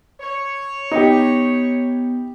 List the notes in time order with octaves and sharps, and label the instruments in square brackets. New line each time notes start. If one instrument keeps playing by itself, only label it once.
[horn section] C#5
[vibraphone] B3 [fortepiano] D#4 G4